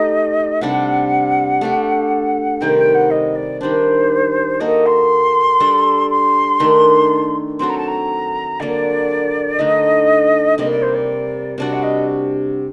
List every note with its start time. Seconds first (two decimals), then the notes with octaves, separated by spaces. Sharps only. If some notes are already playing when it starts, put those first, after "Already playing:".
Already playing: A3 D#4 G4 D#5
0.61 C3 G3 D4 F#5
1.61 A3 D4 G4
2.61 C3 D#3 G3 C4 G5
2.78 G5
2.94 F#5
3.10 D#5
3.35 D5
3.60 D#3 G3 D4 C5
4.60 A#3 F#4 A4 D#5
4.86 C6
5.60 G3 D4 A4
6.10 C6
6.60 D#3 A3 D4
7.59 F#3 C4 F#4 A4 C6
7.69 A#5
7.77 A5
7.87 A#5
8.60 D3 F#3 A#3 D5
9.58 D3 A3 D#4 D#5
10.58 C3 G3 A#3 D#5
10.70 D5
10.82 C5
10.94 D5
11.58 C3 G3 D4 F#4 D5
11.73 F#5
11.83 D#5